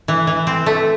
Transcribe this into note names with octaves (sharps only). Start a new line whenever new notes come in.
E3
E3
C4
A3